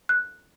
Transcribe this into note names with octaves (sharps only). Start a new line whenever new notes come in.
F#6